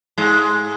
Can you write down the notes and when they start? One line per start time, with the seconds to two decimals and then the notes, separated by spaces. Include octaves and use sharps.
0.18 G#2 G#3